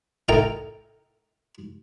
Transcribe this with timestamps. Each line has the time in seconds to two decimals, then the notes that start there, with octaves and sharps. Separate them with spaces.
0.29 D#4 E4 A4 A#4 G5 A#5